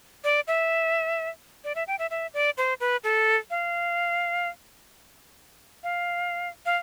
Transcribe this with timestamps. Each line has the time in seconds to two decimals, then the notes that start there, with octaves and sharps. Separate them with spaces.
0.24 D5
0.48 E5
1.64 D5
1.75 E5
1.87 G5
1.99 E5
2.11 E5
2.34 D5
2.57 C5
2.80 B4
3.04 A4
3.50 F5
5.83 F5
6.66 F5